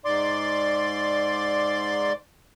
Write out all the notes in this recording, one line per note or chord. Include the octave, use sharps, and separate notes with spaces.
G#2 D5 C6 D6